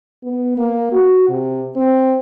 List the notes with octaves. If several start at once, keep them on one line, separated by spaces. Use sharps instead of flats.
B3
A#3
F#4
C3
C4